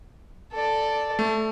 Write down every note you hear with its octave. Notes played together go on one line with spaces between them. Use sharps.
A4 D5
A3